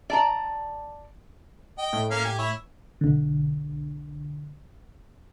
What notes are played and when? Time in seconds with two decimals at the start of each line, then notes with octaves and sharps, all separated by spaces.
0.10 D5 A5 A#5
1.78 D#5 G5
1.93 A2
2.11 A#3 C#4 F5
2.25 G4 G#5
2.39 E4 C#5
3.01 B1 D3